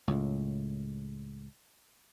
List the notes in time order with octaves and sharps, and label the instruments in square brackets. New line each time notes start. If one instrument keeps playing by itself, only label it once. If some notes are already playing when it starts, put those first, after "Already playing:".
[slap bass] C#2 A2